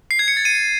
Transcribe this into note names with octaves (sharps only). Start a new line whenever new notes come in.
C7
G#6
C#7
A6
D#7